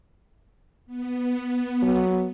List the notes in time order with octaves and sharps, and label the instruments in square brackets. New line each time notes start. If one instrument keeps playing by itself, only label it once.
[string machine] B3
[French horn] F#3